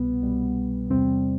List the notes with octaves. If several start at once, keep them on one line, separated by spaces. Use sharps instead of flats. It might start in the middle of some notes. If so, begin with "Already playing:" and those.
Already playing: C2 B2 G3 B3
C2 B2 G3
E2 C3 G3 C4